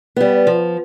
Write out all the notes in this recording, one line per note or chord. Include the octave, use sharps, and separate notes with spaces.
G3 B3
F3